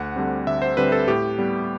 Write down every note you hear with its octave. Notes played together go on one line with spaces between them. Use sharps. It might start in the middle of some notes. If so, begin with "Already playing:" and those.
Already playing: D2 F#5
D3 G3 C4
D2 E5
C5
D3 G3 C4 B4
A4
A2 G4
G3 B3